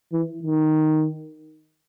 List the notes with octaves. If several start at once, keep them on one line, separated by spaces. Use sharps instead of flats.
E3
D#3